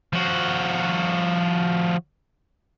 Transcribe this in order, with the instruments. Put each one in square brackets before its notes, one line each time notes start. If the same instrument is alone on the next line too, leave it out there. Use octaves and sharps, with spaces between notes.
[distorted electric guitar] F3 F#4